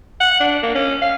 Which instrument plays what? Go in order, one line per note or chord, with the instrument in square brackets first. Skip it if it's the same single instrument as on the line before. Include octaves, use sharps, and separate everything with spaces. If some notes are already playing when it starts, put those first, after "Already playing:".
[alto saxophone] F#5
D4
A#3
C#4
F5